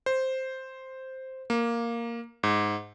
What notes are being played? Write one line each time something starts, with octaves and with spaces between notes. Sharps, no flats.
C5
A#3
G#2